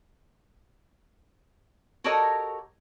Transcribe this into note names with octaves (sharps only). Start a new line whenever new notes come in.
F#4 G4 A4 A#4 C#5 D#5